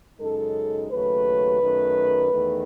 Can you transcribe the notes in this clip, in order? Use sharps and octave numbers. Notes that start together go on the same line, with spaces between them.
F#2 C#3 G#3 D#4 A4
D#2 C#3 F#3 A3 B4
F#2 D#3 A3
E2 D#3 A3